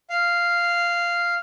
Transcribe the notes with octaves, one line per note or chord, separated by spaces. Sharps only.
F5